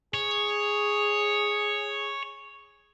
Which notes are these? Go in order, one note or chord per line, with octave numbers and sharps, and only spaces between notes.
G#4 C#5